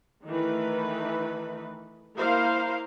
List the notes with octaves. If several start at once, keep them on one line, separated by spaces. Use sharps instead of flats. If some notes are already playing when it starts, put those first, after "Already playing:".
D#3 E3 A3 B4
A#3 E4 A#4 C5 F5